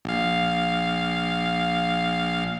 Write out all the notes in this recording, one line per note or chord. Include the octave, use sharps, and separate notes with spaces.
A#1 F5